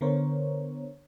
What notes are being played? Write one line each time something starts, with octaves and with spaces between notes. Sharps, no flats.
D3 B3 A#4 C5 C#5